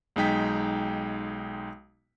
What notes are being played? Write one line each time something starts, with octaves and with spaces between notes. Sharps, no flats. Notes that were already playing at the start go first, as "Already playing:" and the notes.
B1 G#3 D#4 G5 B6